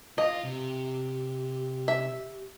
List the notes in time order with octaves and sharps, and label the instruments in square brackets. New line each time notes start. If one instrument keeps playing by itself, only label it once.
[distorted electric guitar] F4 [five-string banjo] D#5
[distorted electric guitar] C3 [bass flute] G4
[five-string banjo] E5